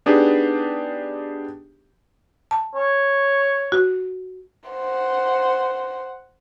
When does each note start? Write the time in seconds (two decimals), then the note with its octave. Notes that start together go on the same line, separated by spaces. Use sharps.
0.06 B3 D4 D#4 G4 G#4
2.51 A5
2.75 C#5
3.72 F#4
4.70 C5 F#5